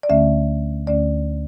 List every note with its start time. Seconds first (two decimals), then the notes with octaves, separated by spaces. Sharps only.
0.03 D5
0.09 D2 D3 A3 C#4 E5
0.87 D2 D3 A3 C#4 D5